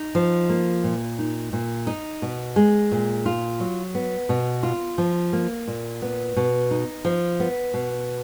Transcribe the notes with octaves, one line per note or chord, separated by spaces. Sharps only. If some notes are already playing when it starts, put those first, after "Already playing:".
Already playing: D#4
F3
A#3
A#2
D#4
A#2
D#4
B2
G#3
A#2
F4
F#3
B3
B2
F4
F3
A#3
A#2
B3
B2
D#4
F3
B3
B2